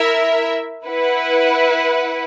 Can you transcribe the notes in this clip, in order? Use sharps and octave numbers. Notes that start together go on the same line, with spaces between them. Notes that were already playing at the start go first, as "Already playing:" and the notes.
Already playing: E4 A#4 E5
E4 B4 F#5